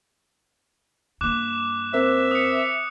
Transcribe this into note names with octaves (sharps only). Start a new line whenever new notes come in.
G2 A#3 D6 F#6 E7
C4 A#4 C5 E5
D#6 C#7